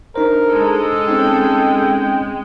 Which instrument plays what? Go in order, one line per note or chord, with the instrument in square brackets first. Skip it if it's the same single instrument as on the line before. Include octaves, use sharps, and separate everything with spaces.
[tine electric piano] D4 D#4 C5 [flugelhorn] A#4
[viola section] G#3 [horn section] A4
[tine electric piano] C4 C#4 D#4 [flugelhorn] G5